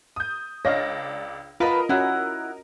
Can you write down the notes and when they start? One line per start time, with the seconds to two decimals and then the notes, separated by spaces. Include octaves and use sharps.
0.16 D#6 G6
0.65 C#2 D4 C#5 D#5 F5 A#6
1.60 F4 A#4 B4 D#5 F5 F#5 A5
1.89 C#4 E4 F#4 F#5